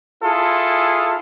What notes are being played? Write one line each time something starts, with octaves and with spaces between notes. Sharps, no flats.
E4 F4 G#4 A4